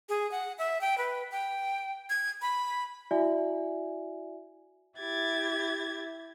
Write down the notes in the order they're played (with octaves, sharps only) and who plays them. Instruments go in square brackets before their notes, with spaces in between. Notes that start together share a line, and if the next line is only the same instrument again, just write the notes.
[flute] G#4
F#5
E5
G5
B4
G5
G#6
B5
[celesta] E4 F#4 D5 E5 G#5
[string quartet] E4 G4 G#6 A6